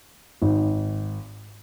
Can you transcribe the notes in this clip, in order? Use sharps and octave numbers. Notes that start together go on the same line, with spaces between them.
G#1